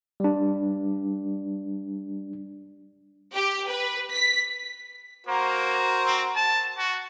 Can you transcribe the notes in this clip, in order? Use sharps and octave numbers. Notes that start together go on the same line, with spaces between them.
G3 D4
G4
B4
B6
A#3 F#4 A#4 C5
C4
A5
F#4